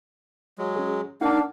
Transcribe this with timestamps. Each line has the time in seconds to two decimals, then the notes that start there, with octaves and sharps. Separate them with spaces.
0.58 F#3 G#3
0.76 C#4 G#4
1.21 A#3 D4 D#4 F5 F#5 A5